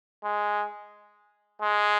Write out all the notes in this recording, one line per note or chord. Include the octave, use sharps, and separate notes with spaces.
G#3
G#3